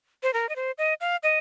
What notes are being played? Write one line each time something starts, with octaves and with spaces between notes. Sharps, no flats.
C5
A#4
D#5
C5
D#5
F5
D#5